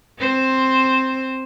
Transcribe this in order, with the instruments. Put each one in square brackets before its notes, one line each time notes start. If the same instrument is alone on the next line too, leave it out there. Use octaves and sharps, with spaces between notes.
[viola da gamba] C4 C5